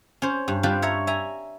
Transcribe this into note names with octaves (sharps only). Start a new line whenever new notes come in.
C#4 C5
G2
G3 D4 F4 B4 C5
C#5 E5 A#5
E5 G#5 A#5